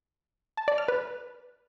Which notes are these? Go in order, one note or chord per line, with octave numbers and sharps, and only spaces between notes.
A5
D5
F6
B4